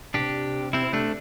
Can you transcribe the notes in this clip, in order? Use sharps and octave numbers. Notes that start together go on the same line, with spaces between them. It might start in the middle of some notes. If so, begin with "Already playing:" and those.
C3 D4 G4
C4 E4
A3 D4